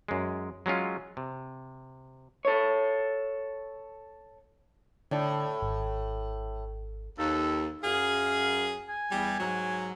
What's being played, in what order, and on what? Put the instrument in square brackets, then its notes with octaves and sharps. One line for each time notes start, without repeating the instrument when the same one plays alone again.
[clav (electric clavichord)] F#2 G#3
F#3 G#3 C#4 F4
C3
[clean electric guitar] A4 C#5
[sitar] A2 [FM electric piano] D3 D5 A5
[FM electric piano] G#1
[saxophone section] D#2 [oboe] A4
[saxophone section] F#2 G#4 [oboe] F5
[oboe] G#5
[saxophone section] E2 G3
G#2 F#3